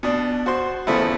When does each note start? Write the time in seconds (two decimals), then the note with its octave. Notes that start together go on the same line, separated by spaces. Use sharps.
0.03 B2 D4
0.46 F#4 C5 C6
0.87 E2 C#3 F3 A3 B3 E4